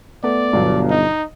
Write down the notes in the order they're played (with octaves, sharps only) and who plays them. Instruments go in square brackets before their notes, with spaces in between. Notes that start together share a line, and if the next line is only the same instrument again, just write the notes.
[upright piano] A3 [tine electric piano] B3 [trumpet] D5
[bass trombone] G1 [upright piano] G2 B2 F#3
[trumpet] D#4 [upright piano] D#5